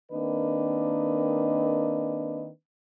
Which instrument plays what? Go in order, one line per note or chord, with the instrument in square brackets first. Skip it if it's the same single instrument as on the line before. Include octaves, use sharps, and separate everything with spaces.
[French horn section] D#3 A#3 C4 D4 B4 D#5